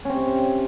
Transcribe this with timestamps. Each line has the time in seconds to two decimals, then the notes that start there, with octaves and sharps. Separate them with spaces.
0.05 C#4
0.09 C4
0.14 C3